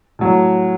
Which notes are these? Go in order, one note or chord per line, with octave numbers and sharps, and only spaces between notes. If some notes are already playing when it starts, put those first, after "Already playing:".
A2 F#3